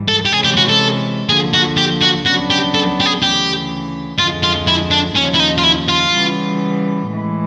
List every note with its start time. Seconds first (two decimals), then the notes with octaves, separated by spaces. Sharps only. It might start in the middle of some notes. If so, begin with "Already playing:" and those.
Already playing: G#2 E3 G3
0.08 A4
0.26 G4
0.33 C3 E3 G#3 C#4 G#4
0.45 G4
0.57 F#4
0.69 A4
1.29 D3 F3 A#3 G#4
1.54 F#4
1.77 G4
2.02 F#4
2.25 C#3 F#3 B3 D4 F#4
2.50 G4
2.75 A4
3.00 G4
3.06 G#4
3.22 D2 C#3 E3 G4
4.19 F2 D3 F3 G#3 F4
4.43 F4
4.67 E4
4.91 D4
5.15 D#2 C#3 F3 C#4
5.34 E4
5.40 D#4
5.58 F4
5.63 E4
5.88 F4
6.11 C#3 E3 G3 B3
7.08 A2 E3 G#3